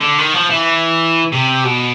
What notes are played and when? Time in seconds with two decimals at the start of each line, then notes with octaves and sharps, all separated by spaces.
0.01 D3
0.18 D#3
0.34 F3
0.50 E3
1.32 C3
1.64 B2